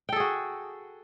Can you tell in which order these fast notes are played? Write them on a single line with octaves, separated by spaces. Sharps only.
G5 A4 G#4 F#4